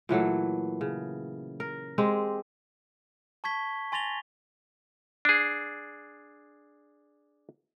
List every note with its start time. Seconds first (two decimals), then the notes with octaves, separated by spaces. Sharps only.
0.09 A#2 E3 F#3 A3
0.81 C#3
1.60 A#4
1.98 G#3 C4 G4
3.44 A5 C#6 G#6 B6 G7
3.92 G#5 C6 A6 A#6 F7 G7
5.25 D4 G#4